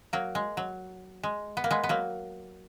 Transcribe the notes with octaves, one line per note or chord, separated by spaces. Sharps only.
F#3 A#3
G#3
F#3
G#3
B3
A#3
G#3 B3
B3
F#3 A#3